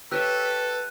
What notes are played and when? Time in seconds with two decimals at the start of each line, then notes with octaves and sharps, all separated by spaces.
0.11 G4 A4 B4 C#5 E5 E6 F#6 D#7